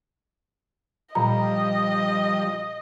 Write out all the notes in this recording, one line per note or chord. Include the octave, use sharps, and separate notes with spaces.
A#2 F3 G3 D#5 A#5